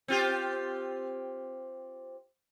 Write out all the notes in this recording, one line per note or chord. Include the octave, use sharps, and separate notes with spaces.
C4 F4 G4